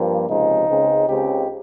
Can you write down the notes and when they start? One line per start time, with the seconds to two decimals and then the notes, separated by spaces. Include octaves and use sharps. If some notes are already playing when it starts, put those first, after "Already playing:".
Already playing: G2 F3 A#3
0.27 C#2 C3 F3 G#3 D#4
0.67 C#2 C#3 G#3 C4
1.08 C#2 C#3 G#3 C4 G4